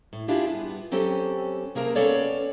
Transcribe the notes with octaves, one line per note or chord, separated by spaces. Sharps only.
A2
D4 E4 F4 G4 G#4
G2 B3
F#3 C4 C#4 G4 A4
C3 A#3 G#4 A#4 D#5 A5
B3 C#4 A4 C#5 D5 F5